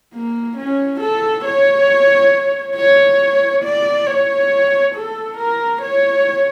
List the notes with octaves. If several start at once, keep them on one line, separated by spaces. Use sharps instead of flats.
A#3
C#4
A4
C#5
C#5
D5
C#5
A4
A#4
C#5